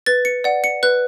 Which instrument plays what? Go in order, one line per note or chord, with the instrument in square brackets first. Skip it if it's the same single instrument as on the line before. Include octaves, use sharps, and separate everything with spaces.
[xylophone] B4 A6
C#7
D5 F#5
C#7
B4 F#6